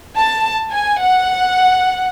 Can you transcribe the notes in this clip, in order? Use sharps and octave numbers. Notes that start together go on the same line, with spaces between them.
A5
G#5
F#5